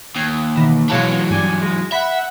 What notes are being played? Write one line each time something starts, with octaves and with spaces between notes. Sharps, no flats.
D#2 G#6
B2 D#3 E3
B2 E3 F#3 G#3 C#5 F5 A5
G2 G3 D4 G#5
G#3
E5 F#5 B5 B6